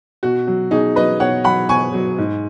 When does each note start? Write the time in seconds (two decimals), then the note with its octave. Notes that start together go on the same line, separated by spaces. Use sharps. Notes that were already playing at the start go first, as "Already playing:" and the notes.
0.23 B2 F#4
0.47 F#3
0.71 B2 D#4 G#4
0.96 F#3 B4 D#5
1.20 B2 C#5 F#5
1.44 F#3 F#5 B5
1.69 B2 G#5 C#6
1.93 F#3
2.18 G#2